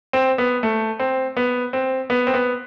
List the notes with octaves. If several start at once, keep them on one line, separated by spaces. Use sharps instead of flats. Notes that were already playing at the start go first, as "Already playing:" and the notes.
C4
B3
A3
C4
B3
C4
B3
C4
B3